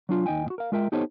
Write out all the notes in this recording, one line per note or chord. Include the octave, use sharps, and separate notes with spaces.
F#3 D4 F4
D#2 D#4 D#5 G5 G#5
A2 F#4
A#4 F5
G#3 F4 A#4 E5 G5
B3 D#4 G4 A4 C5 C#5